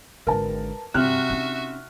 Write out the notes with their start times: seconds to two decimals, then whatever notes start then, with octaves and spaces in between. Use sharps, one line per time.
0.27 G#1 D3 A#4 B4 A5
0.94 G2 C3 F#4 E5 F6 F#6
1.30 C#4 D#4